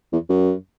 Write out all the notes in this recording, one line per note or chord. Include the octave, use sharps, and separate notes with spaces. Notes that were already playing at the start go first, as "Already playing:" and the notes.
E2
F#2